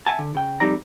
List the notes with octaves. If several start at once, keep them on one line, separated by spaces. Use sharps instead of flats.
E5 F#5 G#5 A5
D3
C#3 G5
F2 C3 G3 D#4 D5 A#5